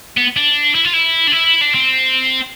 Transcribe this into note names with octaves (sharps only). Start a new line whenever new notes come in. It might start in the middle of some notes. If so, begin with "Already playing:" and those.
B3
D4
E4
F4
E4
D4
E4
D4
C4